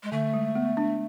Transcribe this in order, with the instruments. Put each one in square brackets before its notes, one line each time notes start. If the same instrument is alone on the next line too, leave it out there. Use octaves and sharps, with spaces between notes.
[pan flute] G#3
[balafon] D3 [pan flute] A3
[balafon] G#3
B3
D4